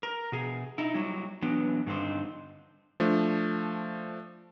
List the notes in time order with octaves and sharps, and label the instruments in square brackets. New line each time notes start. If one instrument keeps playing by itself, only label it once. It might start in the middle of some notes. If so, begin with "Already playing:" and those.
[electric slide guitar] A#4
B2 G#4
D#4 E4
F#3 G3 E4
E3 F#3 B3 D4
G2 D3 D#3 C4 D#4
[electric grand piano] F3 A3 D4